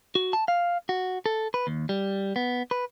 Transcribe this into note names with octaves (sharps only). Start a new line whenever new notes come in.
F#4
A5
F5
F#4
A4
B4
D#2
G3
B3
B4